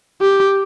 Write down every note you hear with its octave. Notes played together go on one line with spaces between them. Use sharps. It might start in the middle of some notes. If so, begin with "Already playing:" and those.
G4